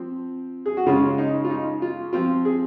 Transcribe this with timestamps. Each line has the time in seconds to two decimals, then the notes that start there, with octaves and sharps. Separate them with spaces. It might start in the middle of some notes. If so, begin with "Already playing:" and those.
Already playing: F3 C4
0.66 G#4
0.77 F#4
0.87 C#3 G#3 C#4 F4
1.18 D#4
1.45 F4
1.50 D#4
1.82 F4
2.13 F3 C4 F4
2.45 G#4